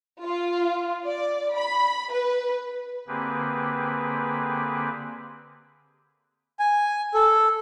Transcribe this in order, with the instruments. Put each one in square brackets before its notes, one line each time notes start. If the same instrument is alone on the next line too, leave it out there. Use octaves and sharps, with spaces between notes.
[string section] F4
D5
B5
B4
[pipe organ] D3 A#3 C4 G4 G#4 B4
[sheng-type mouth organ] G#5
A4